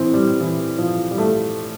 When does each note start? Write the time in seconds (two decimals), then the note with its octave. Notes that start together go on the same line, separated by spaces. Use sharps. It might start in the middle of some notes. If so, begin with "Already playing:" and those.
Already playing: A2 E3 C4
0.14 G3
0.40 E3
0.78 F3
1.11 G3
1.18 A3